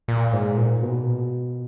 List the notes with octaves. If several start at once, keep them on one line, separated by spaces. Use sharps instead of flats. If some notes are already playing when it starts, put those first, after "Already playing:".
A#2
G#2
A#2
B2